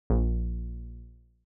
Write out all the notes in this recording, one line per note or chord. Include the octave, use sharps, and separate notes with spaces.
A#1